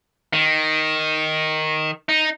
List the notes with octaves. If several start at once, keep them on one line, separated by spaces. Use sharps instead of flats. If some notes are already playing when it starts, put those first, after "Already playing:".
D#3
D#4